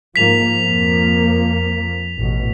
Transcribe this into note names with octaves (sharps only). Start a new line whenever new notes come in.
G#2 F3 A#3 B6 F7
F2 F3 A#3
A1 B2